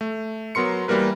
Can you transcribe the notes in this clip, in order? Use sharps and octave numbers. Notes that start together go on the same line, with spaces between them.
A3
F#3 B3 A#4 C6 C#7
E3 G3 A#3 A#4 B4